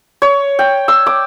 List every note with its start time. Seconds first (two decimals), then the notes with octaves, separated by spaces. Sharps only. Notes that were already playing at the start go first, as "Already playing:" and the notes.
0.22 C#5
0.59 G5
0.88 E6
1.06 D6